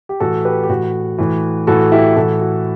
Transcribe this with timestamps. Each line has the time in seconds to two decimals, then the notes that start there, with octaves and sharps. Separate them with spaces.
0.09 G4
0.20 A2 E3 F#4 A4
0.45 G4 B4
0.63 G4
0.69 A2 E3 F#4
1.18 A2 E3
1.67 A2 E3 F#4 A4
1.92 E4 G4
2.16 A2 E3 F#4 A4
2.41 F#4